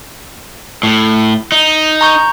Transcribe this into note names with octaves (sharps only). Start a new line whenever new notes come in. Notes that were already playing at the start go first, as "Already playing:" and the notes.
A2
D#4
A#5 C#6 G6